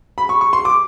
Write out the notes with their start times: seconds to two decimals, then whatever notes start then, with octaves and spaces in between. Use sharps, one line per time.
0.18 B5
0.29 C#6
0.41 C#6
0.53 C6
0.65 D6